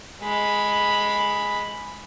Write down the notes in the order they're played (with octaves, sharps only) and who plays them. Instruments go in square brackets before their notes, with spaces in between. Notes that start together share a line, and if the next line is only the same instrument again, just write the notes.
[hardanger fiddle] G#3 B5